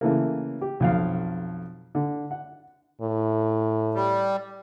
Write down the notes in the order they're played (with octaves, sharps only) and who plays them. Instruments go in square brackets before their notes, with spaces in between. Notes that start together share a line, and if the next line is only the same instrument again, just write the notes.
[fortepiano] C#3 E3 A3 A#3
G4
B1 F2 F5
D3
F#5
[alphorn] A2
[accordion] G3